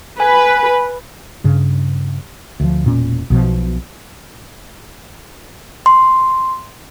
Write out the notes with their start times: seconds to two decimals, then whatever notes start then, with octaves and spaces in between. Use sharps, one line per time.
0.20 B4 G#5
1.44 G2 C#3
2.60 D2 F3
2.84 E1 A#2 C#4
3.30 B1 B2 F3
5.86 C6